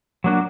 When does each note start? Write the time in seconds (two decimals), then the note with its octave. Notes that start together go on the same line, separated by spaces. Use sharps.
0.24 F#3 A#3 D4 F#4